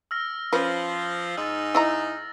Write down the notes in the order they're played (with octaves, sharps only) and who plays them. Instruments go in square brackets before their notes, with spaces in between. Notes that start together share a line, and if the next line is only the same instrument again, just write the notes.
[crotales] E6 F6 A#6
[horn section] F3 [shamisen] C#4 B4
[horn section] G#2 D#4 [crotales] E6 A6
[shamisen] E4 D#5 A#5 [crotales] A#6